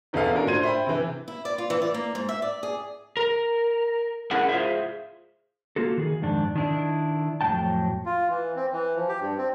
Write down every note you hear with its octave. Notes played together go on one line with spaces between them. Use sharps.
E1 E2 B3 E4 A4 F5
C#4 D4 F#4 A#4
A2 D4 F4 C5 G#6 D#7
C5 E5 G5 B5
C3 E3
E4
D5
F4
E3
D5
A#3
G#2
E5
D5
G#4
A#4
C#4 E4 G#4 A#4 F#5
F4 G#4 C5 E5
A#3 F4 F#4 A4
D#3 G#4
F2 G#2 D#3 D4
D#3 D4 E4
F2 A2 C3 F#3 G5 A5
F4
E3
C4
E3
F3
G4
G2
C4